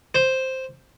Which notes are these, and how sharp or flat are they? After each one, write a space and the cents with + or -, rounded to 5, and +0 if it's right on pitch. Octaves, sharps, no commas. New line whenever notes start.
C5 +0